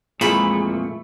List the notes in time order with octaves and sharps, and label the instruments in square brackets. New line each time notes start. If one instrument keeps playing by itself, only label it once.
[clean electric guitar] F2 A#2 [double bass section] E3 G#3 [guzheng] A3 B5 [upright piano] G#4